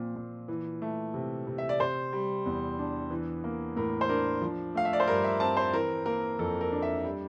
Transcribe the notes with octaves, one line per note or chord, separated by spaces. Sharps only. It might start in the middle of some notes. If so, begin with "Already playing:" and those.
Already playing: A#2 F3 C4
A#2
E3
A3
C3
C3
E5
D5
C3 C5
G3
E2
D4
E3
A#3
A2 A#4
C5
D4 A#4
F3
A3 F5
E5
D5
C5
G2 A#4
E5
C4 A5
C5
E3 A#4
A#3 A#4
F2 A4
A#4
D4
E5
G3